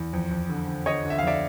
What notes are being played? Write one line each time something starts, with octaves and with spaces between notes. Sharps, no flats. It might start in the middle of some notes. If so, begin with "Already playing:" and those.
Already playing: E2
F2
F2
D3
D3
D3 C#5 D#5
D3
E5
F5
F2 D5 E5